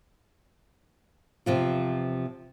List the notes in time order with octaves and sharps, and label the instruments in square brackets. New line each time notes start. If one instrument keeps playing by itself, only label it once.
[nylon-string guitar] E2 C3 F3 F4